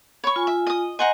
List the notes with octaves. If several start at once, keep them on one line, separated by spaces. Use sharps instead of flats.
C#5 B5 C#6
F4 G#5
E5
D#5 D#6
C5 D#5 F#5 G#5 A#5